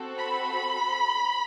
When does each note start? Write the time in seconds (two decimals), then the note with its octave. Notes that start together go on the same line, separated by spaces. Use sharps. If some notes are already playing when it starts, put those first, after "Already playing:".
Already playing: C4 F#4 A4
0.18 B5